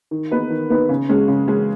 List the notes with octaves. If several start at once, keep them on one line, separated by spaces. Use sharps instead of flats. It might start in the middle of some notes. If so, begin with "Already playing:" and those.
D#3
B3 D#4 B4
D#3
B3 D#4 B4
C#3
G#3 C#4 G#4
C#3
G#3 C#4 G#4